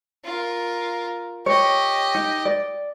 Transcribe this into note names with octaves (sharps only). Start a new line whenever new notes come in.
F4 A#4
G4 C#5 D#5
D#4
D5